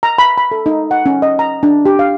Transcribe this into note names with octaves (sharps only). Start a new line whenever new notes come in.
A#5
B5
B5
A4
D#4
F#5
C#4
D#5
A#5
D4
G4
F5